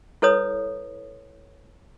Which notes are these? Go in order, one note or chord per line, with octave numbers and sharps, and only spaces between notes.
E4 A4 B4 C#5 D#6